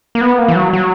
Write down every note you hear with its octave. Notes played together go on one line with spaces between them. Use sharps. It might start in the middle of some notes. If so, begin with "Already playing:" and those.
A#3
B3
A#3
E3
F#3
F#3